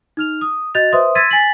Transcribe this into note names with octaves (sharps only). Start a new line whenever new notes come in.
D#4 F6 F7
D#6
F#4 D#5 F#6 G6 A6 F7
B4 C5 E5 C6 D#6
C6 E6 G#6 A6 B6 D#7
G#5 A6 B6 F#7